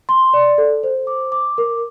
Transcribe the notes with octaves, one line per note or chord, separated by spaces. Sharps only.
C6
D5
A4
C5
D6
D6
A#4